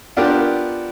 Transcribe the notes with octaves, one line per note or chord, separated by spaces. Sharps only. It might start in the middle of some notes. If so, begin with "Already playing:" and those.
B3 D4 F4 G4 A#4